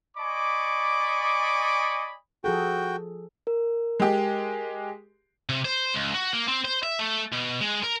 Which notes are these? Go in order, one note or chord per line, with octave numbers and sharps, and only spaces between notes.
D5 D#5 G#5 B5 C#6 D6
F3 F#4 G#4 A4 G5
A#4
G#3 G4
C3
C5
C#2
F#4
A#3
C4
C5
E5
A3
B2
G#3
A#4